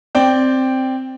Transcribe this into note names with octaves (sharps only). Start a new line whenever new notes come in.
C4 D5 G5